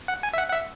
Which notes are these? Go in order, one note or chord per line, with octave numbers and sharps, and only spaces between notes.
F#5
G#5
E5
F#5
F#5
E5